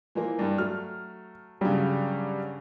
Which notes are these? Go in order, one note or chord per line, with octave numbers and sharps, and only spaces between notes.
E3 F3 A#3
G2 G3
F#3 A3 F6
G2 C#3 F#3 G3